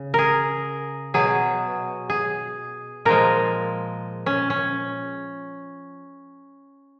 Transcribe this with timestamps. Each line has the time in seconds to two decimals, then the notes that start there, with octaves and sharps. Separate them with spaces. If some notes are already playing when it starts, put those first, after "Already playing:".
Already playing: C#3
0.14 G#4 A#4
1.14 B2 F#3 G#4
2.09 G#4
3.05 A#2 F3 G#3 A#4
4.26 C#4
4.50 C#4